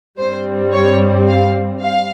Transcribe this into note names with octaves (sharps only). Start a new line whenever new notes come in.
G2 G3 C4 C5
C#5
F5
F5